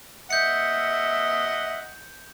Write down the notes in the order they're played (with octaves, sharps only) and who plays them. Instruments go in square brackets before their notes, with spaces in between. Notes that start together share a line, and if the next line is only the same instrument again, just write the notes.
[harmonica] D#5 F#5 [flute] E5 [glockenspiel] G6 C#7